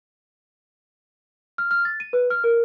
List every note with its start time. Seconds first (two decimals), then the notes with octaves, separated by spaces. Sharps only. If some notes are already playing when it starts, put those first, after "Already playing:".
1.58 F6
1.71 F6
1.85 A6
2.00 D#7
2.13 B4
2.30 F6
2.44 A#4